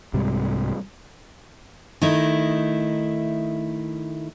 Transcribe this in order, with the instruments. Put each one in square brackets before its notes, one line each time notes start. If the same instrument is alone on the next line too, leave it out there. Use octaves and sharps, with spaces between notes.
[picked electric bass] C2 G#2 C3 G3
[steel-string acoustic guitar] D#3 A3 D#4 E4